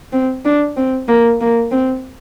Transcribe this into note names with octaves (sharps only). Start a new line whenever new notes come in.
C4
D4
C4
A#3
A#3
C4